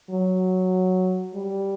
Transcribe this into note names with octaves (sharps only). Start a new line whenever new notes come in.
F#3
G3